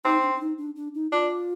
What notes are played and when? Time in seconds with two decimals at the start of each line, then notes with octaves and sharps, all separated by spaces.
0.05 C4 D#4
0.23 D4
0.36 D4
0.41 D#4
0.58 D4
0.76 D4
0.95 D#4
1.11 D4 F4